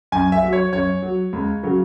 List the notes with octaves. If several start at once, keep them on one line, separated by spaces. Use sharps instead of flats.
F#2 G#5
E5
F#3
C#5
F#2 C#5
F#3
C#2
C#3 F#3